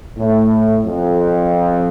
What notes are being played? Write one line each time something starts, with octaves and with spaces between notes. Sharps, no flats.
A2
F2